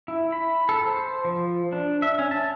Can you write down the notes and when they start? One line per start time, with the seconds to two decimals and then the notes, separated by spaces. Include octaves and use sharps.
0.08 E4
0.32 B5
0.69 A4
0.84 C5
1.25 F3
1.73 D4
2.02 E5
2.19 C#4
2.31 A5